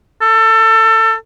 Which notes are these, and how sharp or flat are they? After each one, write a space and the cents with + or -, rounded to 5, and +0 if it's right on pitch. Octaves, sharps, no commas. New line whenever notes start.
A4 +25